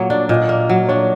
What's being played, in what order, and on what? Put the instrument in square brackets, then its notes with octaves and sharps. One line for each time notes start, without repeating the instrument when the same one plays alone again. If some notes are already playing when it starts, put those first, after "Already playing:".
Already playing: [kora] A#2 F#3 A#3 [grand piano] C#5
[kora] D4 [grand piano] D5
[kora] A#2 [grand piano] D#5
[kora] A#3
F#3
[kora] D4 [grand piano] C#5